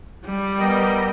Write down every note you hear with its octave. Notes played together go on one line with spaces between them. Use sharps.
G3
B3 A#4 D#5 G5